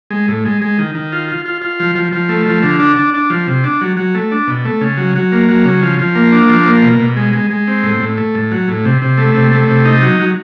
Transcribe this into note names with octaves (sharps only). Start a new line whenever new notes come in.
G#3
A2
G#3
G#3
D#3
D#3
F4
F4
F4
F4
F3
F3
F3
A3
F3
D3
D4
D4
D4
F3
C3
D4
F#3
F#3
A3
D4
B2
A3
C#3
F#3
F#3
A#3
F#3
C#3
F3
F3
A#3
D4
F3
A#3
B2
B2
G#3
G#3
G#3
C4
A2
A2
A3
A2
F#3
A2
C3
C3
A3
C3
A3
C3
D#4
F#3
F#3